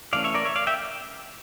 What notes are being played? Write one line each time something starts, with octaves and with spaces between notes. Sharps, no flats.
E3 A3 C#4 D5 F5
C#5 E5
A#4 D5
C#5 E5
D5 F5
E5 G5